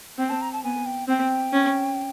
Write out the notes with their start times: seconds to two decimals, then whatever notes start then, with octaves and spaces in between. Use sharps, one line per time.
0.19 C4 G5
0.30 A5
0.41 A#5
0.53 A5
0.64 B3 G#5
0.86 G5
1.08 C4 G5
1.53 C#4